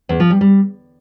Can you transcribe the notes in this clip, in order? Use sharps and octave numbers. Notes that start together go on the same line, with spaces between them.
E2
F3
G3
G3